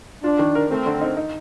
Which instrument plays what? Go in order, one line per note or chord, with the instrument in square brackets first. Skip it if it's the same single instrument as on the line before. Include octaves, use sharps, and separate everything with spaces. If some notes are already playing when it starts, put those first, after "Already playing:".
[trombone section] D4 [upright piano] F4
[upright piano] D#3
A#4
[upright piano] A3 [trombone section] C4
[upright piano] D3
D#4
D#4